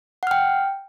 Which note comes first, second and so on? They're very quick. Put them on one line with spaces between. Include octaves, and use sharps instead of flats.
F#5 F6 G5